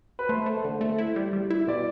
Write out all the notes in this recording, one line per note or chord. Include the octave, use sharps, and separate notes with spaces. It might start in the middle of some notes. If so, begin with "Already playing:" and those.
B4
A3 C5
A3
D3
A3
E4
G3
G3
E4
B2 D5